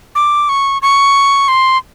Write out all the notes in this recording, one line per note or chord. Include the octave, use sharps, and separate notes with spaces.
D6
C#6
C#6
C6